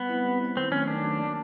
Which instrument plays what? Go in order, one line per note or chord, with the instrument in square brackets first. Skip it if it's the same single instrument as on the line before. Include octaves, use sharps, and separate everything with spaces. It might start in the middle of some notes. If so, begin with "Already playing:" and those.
Already playing: [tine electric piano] G3 [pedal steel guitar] B3
[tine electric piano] C4 E4
G3
C4 E4
[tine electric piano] D#3 [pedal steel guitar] C4
[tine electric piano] F#3 A3 [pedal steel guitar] C#4
[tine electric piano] D#3 [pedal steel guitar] D4
[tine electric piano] F#3 A3
A#3